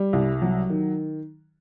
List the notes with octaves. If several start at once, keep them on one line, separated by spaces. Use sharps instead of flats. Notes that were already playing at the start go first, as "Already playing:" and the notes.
Already playing: G3
C2
F#3
D#3